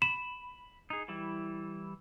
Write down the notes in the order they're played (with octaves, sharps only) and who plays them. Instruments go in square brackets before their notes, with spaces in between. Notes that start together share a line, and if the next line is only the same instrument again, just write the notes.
[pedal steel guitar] B5 [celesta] E7
[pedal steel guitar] D#4 G#4
E3 G3 E4